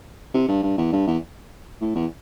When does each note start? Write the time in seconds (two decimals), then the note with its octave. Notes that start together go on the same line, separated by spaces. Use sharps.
0.34 C3
0.48 G2
0.63 G2
0.78 E2
0.92 G2
1.07 E2
1.81 A2
1.96 E2